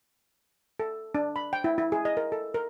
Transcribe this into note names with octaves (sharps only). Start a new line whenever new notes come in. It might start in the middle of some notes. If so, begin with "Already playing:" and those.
A4
D4
B5
G5
E4
E4
G#4
D#5
A#4
A4
A#4